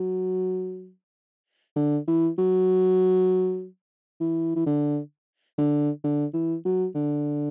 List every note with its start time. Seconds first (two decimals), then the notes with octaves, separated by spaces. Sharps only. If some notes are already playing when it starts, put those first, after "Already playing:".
Already playing: F#3
1.77 D3
2.08 E3
2.38 F#3
4.21 E3
4.56 E3
4.66 D3
5.58 D3
6.04 D3
6.34 E3
6.65 F#3
6.95 D3